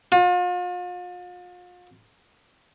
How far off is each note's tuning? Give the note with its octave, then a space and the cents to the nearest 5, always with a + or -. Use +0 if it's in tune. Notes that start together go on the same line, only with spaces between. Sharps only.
F4 +40